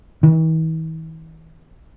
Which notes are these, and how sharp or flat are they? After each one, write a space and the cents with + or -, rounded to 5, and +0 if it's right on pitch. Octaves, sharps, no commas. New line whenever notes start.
E3 -45